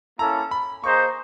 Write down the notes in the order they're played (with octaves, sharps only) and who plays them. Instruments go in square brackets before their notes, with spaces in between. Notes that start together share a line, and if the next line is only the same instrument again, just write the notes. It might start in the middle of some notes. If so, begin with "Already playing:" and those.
[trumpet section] A#3 C#4 E4 A4 [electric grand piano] A#5
[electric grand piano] B5
[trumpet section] A#3 D#4 G#4 C5 D#5 [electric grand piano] C#6